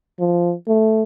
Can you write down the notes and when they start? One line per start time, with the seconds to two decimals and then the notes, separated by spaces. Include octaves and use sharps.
0.19 F3
0.68 A3